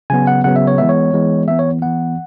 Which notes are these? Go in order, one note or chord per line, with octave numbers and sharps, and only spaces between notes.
C#3 F#3 B3 G#5
F#5
C#3 F#3 B3 F#5
E5
C#5
E3 G#3 B3 E5
C#5
E3 G#3 B3
E3 B3 E5
C#5
E3 B3 F#5